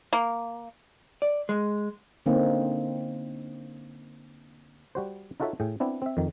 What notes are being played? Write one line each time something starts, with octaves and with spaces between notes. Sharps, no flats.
A#3
D5
G#3
D3 A#3 C4 C#4 D#4
G3 F#4 C5
D#4 F4 F#4 A4 C#5 E5
A2 G#4 G5
B3 C4 D4 E4
C4 E5
F2 D#3